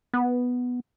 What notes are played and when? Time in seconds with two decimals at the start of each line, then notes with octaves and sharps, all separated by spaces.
0.14 B3